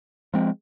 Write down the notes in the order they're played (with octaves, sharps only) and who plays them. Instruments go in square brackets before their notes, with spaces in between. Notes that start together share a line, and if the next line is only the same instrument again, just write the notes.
[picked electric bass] F3 G#3 C4